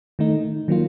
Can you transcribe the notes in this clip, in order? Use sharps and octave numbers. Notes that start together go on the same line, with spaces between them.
D#3 A3 D#4
D#3 F#3 A#3 F4